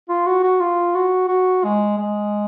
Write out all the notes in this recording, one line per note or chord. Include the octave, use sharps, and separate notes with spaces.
F4
F#4
F#4
F4
F#4
F#4
G#3
G#3